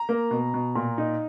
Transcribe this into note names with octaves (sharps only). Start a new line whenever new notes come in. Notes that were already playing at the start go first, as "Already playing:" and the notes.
Already playing: A#5
A#3
B2
B2
A#2
D#4